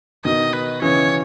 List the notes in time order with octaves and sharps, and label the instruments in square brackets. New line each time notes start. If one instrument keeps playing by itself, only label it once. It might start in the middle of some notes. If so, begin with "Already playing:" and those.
[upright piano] B2 D#3 [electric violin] D#5
[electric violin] B4
[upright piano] C#3 E3 [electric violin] C#5